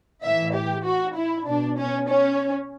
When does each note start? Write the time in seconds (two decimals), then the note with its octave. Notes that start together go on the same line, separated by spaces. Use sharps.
0.23 A2 E3 E5
0.54 G4
0.84 F#4
1.15 E4
1.47 B2 D4
1.77 C#4
2.08 C#4